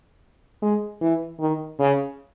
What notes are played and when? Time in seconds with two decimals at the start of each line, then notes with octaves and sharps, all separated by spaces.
0.62 G#3
1.01 E3
1.40 D#3
1.79 C#3